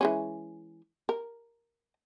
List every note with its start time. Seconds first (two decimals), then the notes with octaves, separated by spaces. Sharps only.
0.01 E3 G#3 C#4
1.09 A#4